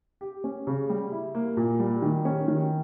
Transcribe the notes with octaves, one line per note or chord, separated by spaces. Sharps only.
G4
C#4
C#3
G3
E4
A#3
A#2
G3
D#3
C#4
D#3